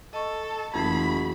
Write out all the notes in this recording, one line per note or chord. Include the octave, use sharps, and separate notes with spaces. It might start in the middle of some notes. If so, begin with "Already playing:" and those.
A4 D#5 C#6
F#1 F2 E3 A3 B5